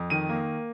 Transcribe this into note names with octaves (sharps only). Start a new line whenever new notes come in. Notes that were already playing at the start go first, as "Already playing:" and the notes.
Already playing: F2
D#3 D#7
A#3